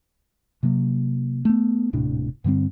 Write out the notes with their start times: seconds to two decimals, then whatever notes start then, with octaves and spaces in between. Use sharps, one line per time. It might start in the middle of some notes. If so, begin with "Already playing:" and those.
0.63 C3 F#3 A#3
1.45 A3 B3
1.93 D#1 A2 C3 D4
2.44 G2 D3 G3 C4